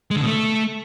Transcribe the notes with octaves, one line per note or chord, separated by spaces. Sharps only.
G#3
D3
B2
A3